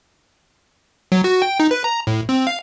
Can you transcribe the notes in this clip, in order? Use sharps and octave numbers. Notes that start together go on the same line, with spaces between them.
F#3
F#4
G5
D#4
B4
A#5
A2
C4
F5